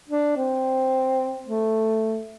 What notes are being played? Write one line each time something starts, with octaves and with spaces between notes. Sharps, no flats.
D4
C4
A3